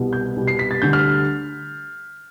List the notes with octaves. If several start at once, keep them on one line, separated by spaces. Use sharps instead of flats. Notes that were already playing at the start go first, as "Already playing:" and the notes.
Already playing: C2 B2 G3 B3
G6
C2 B2 G3 B3
C7
B6
A6
D2 D3 G3 G6
F6